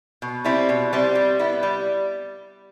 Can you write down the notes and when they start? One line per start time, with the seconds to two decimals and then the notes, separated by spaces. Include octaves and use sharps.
0.22 B2
0.44 G3 C4 E4
0.69 B2
0.93 G3 C4 E4
1.15 G3
1.39 B3 E4
1.63 G3